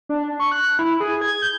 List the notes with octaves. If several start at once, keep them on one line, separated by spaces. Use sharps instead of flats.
D4
C#6
F#6
E4
G#4
G#6
G6